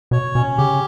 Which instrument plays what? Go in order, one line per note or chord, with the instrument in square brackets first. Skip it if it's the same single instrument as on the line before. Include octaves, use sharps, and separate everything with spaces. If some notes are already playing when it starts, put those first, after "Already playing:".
[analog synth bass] B2 [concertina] C#5
[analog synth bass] B2 [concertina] C#4
[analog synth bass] C#3 [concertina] G4